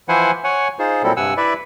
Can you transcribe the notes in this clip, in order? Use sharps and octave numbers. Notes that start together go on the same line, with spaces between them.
E3 F3 E4 C5 F#5 G#5
C#5 F#5 G#5
D#4 F4 G#4 C5
A#2 F#3 G3 C4 E4 A4
G2 C3 F#5 G#5 E6
E4 B4 D5 E5